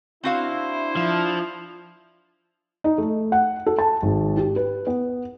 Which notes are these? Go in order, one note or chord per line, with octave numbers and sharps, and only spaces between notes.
C4 D4 E4 F#4 C5 F5
F3
D#4
A3
F#5
A4
A5
G#1
G4
B4
B3